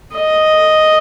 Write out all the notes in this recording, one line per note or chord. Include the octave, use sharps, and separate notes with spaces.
D#5